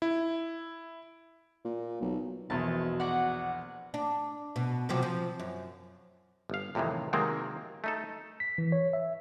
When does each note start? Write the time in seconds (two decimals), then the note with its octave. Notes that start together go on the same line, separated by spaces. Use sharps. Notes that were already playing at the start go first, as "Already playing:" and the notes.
0.02 E4
1.65 A#2
2.01 B1
2.50 A#1 E2 B2 A5
3.00 F#4 D5 F#5
3.94 D4
4.56 B2
4.89 C3 F3 F#3
5.03 F3
5.40 F#2
6.50 G1 F5
6.75 F2 A2 C3 D#3 E3
7.13 C3 D#3 F#3 G#3 A#3 C4
7.84 A3 D#4 A4
8.40 B6
8.58 E3
8.72 C#5
8.93 E5